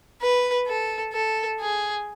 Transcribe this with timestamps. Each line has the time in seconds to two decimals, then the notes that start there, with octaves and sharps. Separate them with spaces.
0.21 B4
0.68 A4
1.13 A4
1.60 G#4